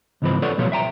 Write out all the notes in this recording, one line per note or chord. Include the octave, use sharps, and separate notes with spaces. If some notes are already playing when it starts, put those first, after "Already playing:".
C#2 G#2 E3 F3 C4 B4
A4 B4 C#5 D5 F#5
B1 A#2 F3 G3 F4 C#5
E5 G5 A#5